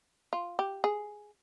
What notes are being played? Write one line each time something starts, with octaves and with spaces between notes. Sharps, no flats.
F4
G4
G#4